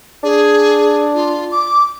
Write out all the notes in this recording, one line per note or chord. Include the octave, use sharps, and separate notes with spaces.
D4 G#4
F4
D6